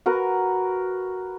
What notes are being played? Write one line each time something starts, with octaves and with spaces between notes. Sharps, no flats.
F#4 A#4 B4